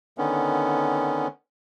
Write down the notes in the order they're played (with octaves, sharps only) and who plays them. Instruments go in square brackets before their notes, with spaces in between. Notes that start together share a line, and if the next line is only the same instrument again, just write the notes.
[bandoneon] D3 D#3 B3 C#4